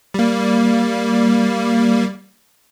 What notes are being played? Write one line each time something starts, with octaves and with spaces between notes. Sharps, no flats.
G3 A#3